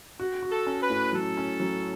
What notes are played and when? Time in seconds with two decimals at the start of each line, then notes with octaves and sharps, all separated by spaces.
0.20 F#4
0.43 F#4
0.50 A4
0.67 C#4
0.82 B4
0.90 A2
1.13 F#3 A4
1.37 C#4
1.60 F#3